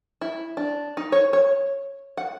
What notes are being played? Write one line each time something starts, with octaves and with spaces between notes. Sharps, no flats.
E4
D4
D#4
C#5
C#5
F#5